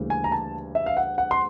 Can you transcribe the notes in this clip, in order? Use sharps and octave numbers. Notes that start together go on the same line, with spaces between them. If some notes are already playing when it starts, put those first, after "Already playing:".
Already playing: D2 C#3 E3 G3 A#3
G#5
A#5
A5
E5
F5
F#5
F#5
C6